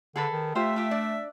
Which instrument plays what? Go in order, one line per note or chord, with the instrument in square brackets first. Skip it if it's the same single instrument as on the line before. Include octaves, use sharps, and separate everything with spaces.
[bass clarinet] D3 [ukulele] G#4 A4 B4
[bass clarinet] D#3
[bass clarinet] A3 [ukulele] F4 G4 C5 [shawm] E5
[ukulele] F4 G4
D4 D5